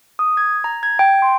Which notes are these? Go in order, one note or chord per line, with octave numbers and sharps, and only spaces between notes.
D#6
G#6
A#5
G#6
G5
C6